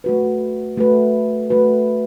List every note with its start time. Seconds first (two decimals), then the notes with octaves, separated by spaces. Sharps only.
0.04 A3 F#4 B4
0.77 A3 F#4 B4
1.50 A3 F#4 B4